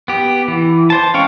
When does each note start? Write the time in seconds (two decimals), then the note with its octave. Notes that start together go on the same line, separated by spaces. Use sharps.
0.08 B3 G4
0.48 E3
0.90 C5 A5
1.14 G#3 C#4 F5 G5 C#6